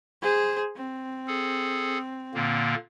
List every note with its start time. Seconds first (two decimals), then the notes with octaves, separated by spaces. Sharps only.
0.22 G#4 C5
0.76 C4
1.27 G#4 A4
2.34 A#2 D3 A#3